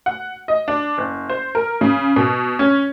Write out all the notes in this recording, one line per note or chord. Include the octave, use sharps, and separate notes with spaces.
F#5
D#5
D4
F#1
C5
A#4
C#3
B2
C#4